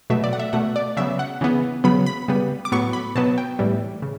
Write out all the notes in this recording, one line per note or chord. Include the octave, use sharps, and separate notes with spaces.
B2 F#3 A3 E5
D5
F#5
E5
B2 A3 F#5
D5
C#3 F#3 B3 E5
F#5
C#3 E3 B3
C#3 F#3 B3 B5
B5
C#3 G3 B3
D6
A2 F#3 B3 C#6
B5
B2 F#3 B3 A5
G5
A2 E3 G3
C#3